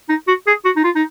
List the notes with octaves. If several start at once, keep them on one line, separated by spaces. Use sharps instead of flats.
D#4
F#4
G#4
F#4
D#4
F4
D#4